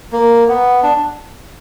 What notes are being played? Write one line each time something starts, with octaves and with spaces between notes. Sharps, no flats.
A#3
B3
D4